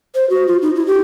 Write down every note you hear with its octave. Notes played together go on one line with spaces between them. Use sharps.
C5
F#4
F4
D#4
E4
G4